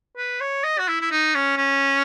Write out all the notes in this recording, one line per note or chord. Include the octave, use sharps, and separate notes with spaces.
B4
C#5
D#5
F#4
E4
E4
D#4
C#4
C#4